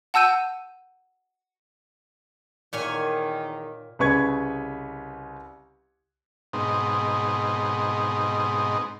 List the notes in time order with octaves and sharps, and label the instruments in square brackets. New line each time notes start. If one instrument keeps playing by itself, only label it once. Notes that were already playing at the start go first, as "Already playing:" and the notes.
[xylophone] F#5 A5 E6 G6 D#7
[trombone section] E2 D#3 [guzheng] A#2 C#5 G#5
[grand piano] C2 C#3 B4 C#6 G#6
[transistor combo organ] G#2 B2 C4 D#4